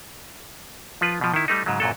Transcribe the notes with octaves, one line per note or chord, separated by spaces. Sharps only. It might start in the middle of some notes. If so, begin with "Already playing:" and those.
F3 F4 B4
B2 F3
D#3 E4
G3 A3 D#4
G#2 C#3 F#3
F#2 A#2 F#3 A4